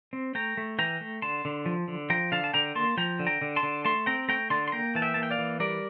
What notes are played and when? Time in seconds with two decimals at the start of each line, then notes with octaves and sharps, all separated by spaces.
0.13 C4
0.35 A3 G5 A#5
0.57 A3
0.79 E3 G5 A#5
1.01 A3
1.22 D3 A5 C6
1.45 D3
1.66 F3
1.88 D3
2.10 F3 G5 A#5
2.32 D3 F5 A5
2.44 A5
2.54 D3 G5 A#5
2.75 A#3 A5 C6
2.97 F3 G5 A#5
3.19 D3
3.27 G5 A#5
3.42 D3
3.56 A5 C6
3.63 D3
3.85 A3 A5 C6
4.06 C4 G5 A#5
4.28 A3 G5 A#5
4.50 D3 A5 C6
4.68 C6
4.72 A#3 G5 A#5
4.95 E3 A5
5.02 E5 G5
5.14 A#3 A5
5.23 G5
5.31 D5 F5
5.38 E3
5.60 G3 A#4 D5